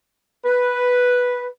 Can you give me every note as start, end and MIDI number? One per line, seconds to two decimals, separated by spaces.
0.46 1.48 71